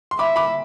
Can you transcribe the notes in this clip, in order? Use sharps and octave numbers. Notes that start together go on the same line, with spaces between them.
C6
E5 B5 D6
B5 D6